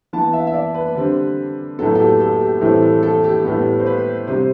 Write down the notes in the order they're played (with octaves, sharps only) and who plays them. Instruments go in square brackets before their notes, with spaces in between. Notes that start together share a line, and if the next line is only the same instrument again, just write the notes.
[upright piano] E3 B3 A5
E5
E5
D5
B4
D3 G3 C4
A2 F#3 B3 A4
A4
G4
A4
G4
A2 E3 G3 C4 A4
A4
A4
G4
A2 G3 B3 A4
C5
B4
C3 G3 C4 C5